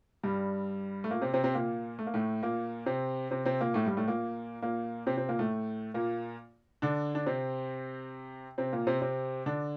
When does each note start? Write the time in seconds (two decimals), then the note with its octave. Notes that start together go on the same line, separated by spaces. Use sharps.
0.23 G2 G3
1.04 A3
1.11 A#2 A#3
1.22 C3 C4
1.34 C3 C4
1.44 C3 C4
1.55 A#2 A#3
1.99 A3
2.07 A#3
2.14 A2 A3
2.43 A#2 A#3
2.86 C3 C4
3.31 C3 C4
3.46 C3 C4
3.60 A#2 A#3
3.74 A2 A3
3.86 G2 G3
3.97 A2 A3
4.07 A#2 A#3
4.62 A#2 A#3
5.07 C3 C4
5.17 C3 C4
5.29 A#2 A#3
5.39 A2 A3
5.94 A#2 A#3
6.82 D3 D4
7.15 D4
7.26 C3 C4
8.58 C3 C4
8.73 A#2 A#3
8.87 C3 C4
9.02 C3 C4
9.46 D3 D4